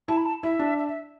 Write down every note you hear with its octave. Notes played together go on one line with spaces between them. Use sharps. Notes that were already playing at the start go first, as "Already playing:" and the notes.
E4 A5
B5
A5
E4 E5
D4
E5
E5